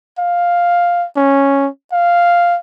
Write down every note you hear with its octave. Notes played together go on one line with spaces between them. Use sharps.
F5
C#4
F5